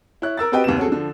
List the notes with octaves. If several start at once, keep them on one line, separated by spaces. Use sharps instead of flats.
E4 C#5 F#6
A#4 E6 A6
C4 F#4 G4 B4 D#5 G5
D#2 C3 B3 E7
C4 C#4 F#4 G#4 A4
D3 F3